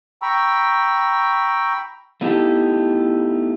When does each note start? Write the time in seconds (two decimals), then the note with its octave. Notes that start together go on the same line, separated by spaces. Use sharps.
0.22 G5 A#5 B5 C#6 E6
2.21 A3 B3 D#4 E4 G4 A4